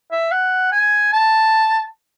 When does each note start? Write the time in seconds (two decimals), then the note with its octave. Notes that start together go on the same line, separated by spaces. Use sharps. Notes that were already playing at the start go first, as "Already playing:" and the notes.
0.12 E5
0.32 F#5
0.72 G#5
1.12 A5